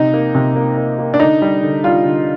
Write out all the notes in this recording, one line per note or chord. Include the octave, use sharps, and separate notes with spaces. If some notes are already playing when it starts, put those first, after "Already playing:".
Already playing: C3 D#4
A#3
C3
A#3
A#3
A#3
D4
D3 D#4
G3
D3
G3 F4
D3